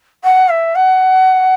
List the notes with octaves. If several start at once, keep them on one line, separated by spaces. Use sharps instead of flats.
F#5
E5
F#5